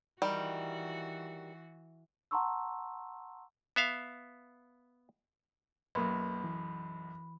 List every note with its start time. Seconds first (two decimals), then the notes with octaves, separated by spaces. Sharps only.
0.22 D#3 E3 G3 F#4
2.31 F#5 A5 A#5 C6 C#6 E6
3.76 B3 E5 F5
5.95 B1 F#2 A#3 B4 B5
6.44 E3